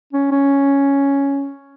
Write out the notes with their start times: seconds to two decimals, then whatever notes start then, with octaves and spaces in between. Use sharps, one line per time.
0.13 C#4
0.32 C#4